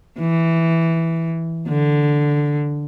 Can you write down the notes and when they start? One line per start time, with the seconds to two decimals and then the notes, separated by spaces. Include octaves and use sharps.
0.19 E3
1.68 D3